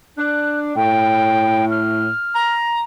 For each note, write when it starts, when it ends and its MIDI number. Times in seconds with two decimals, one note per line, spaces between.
0.18 0.73 62
0.18 0.59 90
0.76 2.09 45
0.76 1.65 79
1.70 2.54 89
2.35 2.83 82